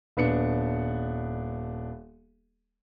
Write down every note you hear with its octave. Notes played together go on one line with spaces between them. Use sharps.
D#1 B3 D4 C#7